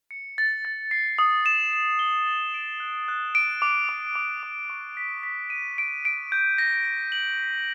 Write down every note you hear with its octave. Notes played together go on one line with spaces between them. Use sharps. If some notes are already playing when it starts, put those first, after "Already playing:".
C#7
A6
A6
C7
D#6
E7
E7
G7
A6
D7
F#6
F#6
D7
D6
D6
D6
D6
C#6
B6
B6
D#7
D7
D7
G6
A#6
D7
F#7
B6